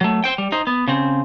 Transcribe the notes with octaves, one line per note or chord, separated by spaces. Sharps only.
F#3 A3
C5 G5
G3
D#4 C5
B3
C#3 C4